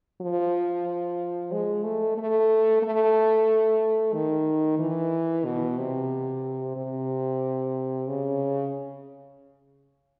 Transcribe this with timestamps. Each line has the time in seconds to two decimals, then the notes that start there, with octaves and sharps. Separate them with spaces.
0.21 F3
1.52 G#3
1.84 A3
2.18 A3
2.83 A3
4.14 D#3
4.79 E3
5.45 B2
5.78 C3
6.77 C3
8.08 C#3